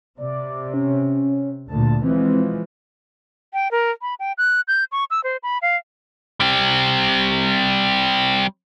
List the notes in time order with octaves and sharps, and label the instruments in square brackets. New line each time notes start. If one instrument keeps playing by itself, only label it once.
[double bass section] C3 [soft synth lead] D5
[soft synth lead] C#4
[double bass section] D2 A#2 [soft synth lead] A5
[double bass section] E3 F3 G#3 [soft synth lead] C4
[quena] G5
A#4
B5
G5
F#6
G6
C#6
E6
C5
B5
F5
[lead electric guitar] G3 C4